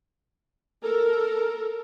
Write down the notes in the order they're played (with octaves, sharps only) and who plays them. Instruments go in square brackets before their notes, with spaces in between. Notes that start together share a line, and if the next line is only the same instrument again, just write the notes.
[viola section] A4 A#4